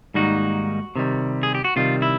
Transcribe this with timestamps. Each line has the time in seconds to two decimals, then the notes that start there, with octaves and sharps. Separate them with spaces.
0.14 G#2 D#3 G3 A#3 D#4 F#4
0.96 C3 D#3 G3
1.43 G#4
1.55 G4
1.64 F#4
1.76 C3 D#3 G3 F4
2.02 E4